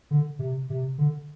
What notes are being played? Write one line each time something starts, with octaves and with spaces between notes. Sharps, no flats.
D3
C3
C3
D3